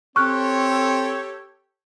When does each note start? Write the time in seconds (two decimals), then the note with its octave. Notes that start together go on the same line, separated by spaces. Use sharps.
0.16 C4 G4 A4 C#5 C#6 F6 F#6